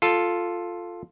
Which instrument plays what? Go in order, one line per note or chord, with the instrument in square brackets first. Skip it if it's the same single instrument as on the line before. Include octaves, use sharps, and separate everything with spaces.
[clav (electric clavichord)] F4 A4